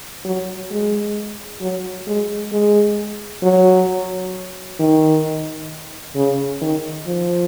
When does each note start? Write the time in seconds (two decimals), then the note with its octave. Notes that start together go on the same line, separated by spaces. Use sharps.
0.25 F#3
0.71 G#3
1.61 F#3
2.07 G#3
2.52 G#3
3.43 F#3
4.80 D#3
6.16 C#3
6.61 D#3
7.07 F3